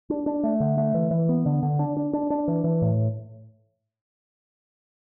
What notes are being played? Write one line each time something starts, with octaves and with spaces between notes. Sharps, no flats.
D4
D4
A3
D3
A3
E3
E3
B3
D3
D3
D4
D4
D4
D4
E3
E3
A2